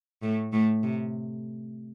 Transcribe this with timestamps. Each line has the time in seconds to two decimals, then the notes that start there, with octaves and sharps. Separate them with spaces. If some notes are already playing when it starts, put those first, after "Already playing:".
0.22 A2 A3
0.52 A2 A3
0.83 C3